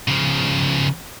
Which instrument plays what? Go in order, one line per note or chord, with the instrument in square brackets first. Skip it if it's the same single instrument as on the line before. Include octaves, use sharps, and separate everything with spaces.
[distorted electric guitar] C#3 F3